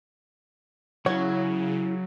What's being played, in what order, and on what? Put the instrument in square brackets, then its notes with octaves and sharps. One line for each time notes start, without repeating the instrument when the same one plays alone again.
[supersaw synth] C#3 [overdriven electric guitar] F#3 [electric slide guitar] E4 F#5 [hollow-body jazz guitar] C#5